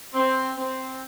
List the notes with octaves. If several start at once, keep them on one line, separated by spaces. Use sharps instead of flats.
C4
C4